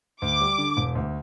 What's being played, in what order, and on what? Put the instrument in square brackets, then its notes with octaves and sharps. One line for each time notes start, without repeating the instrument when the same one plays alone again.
[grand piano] D2 [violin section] D6
[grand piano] G3
D3
E1
D2